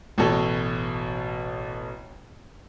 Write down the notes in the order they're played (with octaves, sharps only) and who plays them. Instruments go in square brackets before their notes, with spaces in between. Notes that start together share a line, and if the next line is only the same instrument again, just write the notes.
[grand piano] A1 B2 A4 C#5